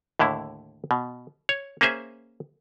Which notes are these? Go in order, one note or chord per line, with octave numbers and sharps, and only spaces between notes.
D#2 A2 D3 E4
B2
C#5
A#3 C#4 G#4 C5 E5